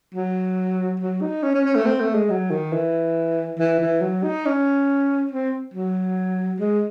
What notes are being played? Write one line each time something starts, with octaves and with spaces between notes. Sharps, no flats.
F#3
F#3
D#4
C#4
C#4
C#4
A3
C4
A3
G#3
F#3
D#3
E3
E3
E3
F#3
D#4
C#4
C4
F#3
G#3